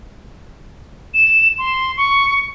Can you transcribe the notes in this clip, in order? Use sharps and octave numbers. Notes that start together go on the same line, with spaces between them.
E7
C6
C#6